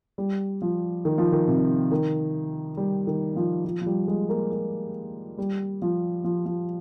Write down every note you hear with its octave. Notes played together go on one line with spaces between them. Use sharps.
G3
F3
D#3
F3
D#3
C3
D#3
G3
D#3
F3
F3
F3
G3
G#3
A#3
A#3
G3
F3
F3
F3